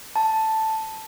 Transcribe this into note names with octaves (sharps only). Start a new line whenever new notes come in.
A5